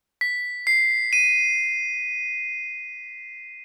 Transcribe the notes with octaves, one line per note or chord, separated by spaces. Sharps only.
B6
C7
D#7